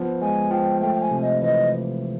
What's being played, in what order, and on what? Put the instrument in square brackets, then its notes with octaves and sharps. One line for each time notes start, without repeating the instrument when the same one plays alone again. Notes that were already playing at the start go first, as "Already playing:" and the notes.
Already playing: [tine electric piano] F3 B3
[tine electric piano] G#3 [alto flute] G#5
[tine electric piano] F3 [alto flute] G5
[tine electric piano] A3 [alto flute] G5
[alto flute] G5
G#5
[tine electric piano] C3
[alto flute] D#5
[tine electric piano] E3 [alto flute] D#5